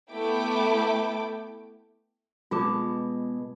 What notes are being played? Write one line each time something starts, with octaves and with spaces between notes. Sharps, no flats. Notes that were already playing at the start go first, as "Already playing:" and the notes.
A3 B3 E4 G5 D6
B2 G#3 F4 A5 D6